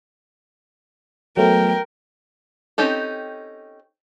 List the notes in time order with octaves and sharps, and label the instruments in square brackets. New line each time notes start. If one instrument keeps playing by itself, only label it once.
[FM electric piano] F#3 A3 B3 [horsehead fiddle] A#4 G5
[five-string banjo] C4 C#4 D#4 G4 A4